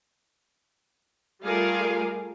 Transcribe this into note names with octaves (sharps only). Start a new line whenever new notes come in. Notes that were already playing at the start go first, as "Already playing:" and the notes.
G3 A3 F4 G#4 A#4 F5